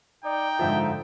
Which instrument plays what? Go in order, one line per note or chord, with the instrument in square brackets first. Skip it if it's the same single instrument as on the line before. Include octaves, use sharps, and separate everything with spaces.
[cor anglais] D#4 [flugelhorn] D5 [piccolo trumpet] G5
[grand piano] G#2 D3 F3 [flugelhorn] E5